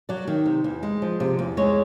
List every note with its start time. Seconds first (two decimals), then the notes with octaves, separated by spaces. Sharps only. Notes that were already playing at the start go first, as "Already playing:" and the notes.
0.09 F#3 D5
0.27 D#3
0.46 C3
0.64 E2
0.83 G#3
1.02 F3
1.20 C3
1.39 E2
1.57 G#3 C#5